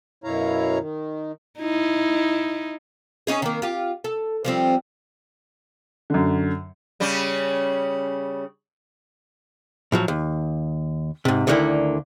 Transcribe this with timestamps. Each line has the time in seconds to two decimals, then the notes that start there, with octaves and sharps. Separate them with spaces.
0.24 F#2 B2 E4 C#5 F5 A#5
0.79 D#3
1.59 D#4 E4
3.27 C#4 D#4 G#4
3.42 D#3 A#3
3.62 F4 G4
4.04 A4
4.45 F3 G3 C4
6.10 F#2 D3
7.00 C#3 G3 C#4
9.92 A2 F3 F#3
10.08 D#2
11.25 G#2 C3
11.47 D2 D3 D#3 G3 A#3 E4